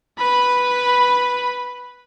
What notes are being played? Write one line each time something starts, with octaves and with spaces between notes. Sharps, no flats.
B4 B5